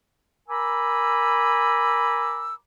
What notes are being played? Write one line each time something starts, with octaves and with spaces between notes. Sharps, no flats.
A#4 G#5 A#5 B5 D6 E6